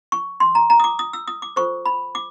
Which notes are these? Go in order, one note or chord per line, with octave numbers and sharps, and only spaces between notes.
C#6
C6
A#5
A#5
D#6
D6
D#6
E6
D#6
D6
F4 A4 C5 C#6
B5
D6